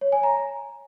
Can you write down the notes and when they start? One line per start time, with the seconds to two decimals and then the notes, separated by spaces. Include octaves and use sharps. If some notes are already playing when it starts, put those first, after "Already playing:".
0.01 C#5
0.12 G#5
0.23 A#5